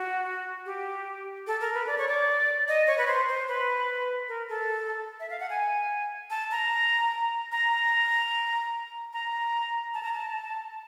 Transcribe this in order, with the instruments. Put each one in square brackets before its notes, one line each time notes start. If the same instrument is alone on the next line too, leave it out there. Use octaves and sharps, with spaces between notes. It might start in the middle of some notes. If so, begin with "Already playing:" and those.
Already playing: [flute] F#4
G4
A4
A#4
B4
D5
C#5
D5
D#5
C#5
B4
C5
C5
B4
A#4
A4
E5
F5
F#5
G#5
A5
A#5
A#5
A#5
A5
A#5
A5